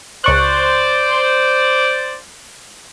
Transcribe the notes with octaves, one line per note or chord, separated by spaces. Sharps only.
C#2 C5 D5 C#6 F#6